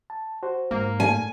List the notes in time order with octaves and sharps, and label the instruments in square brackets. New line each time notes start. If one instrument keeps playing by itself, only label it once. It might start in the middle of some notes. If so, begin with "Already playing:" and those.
[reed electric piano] A5
F#4 C5
[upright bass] G#2 [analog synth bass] A#3
[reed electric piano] A2 [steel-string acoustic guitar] G#5